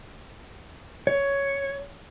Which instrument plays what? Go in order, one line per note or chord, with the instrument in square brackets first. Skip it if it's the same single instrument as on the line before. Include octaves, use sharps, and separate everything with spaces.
[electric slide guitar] C#5